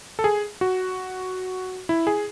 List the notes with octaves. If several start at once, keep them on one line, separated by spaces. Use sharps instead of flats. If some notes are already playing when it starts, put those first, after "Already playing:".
A4
G#4
F#4
E4
G#4